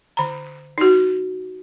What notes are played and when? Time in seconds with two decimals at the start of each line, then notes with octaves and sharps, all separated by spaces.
0.17 D3 A#5
0.78 D#4 F#4